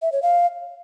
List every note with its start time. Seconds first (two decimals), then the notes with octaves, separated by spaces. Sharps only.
0.02 E5
0.12 C#5
0.22 F5